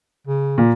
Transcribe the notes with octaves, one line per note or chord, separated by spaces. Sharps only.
C#3
A#2